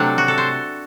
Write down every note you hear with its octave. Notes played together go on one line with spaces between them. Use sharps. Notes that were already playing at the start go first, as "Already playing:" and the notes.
Already playing: C3 F#3 A3 D4
F#4
A4
C5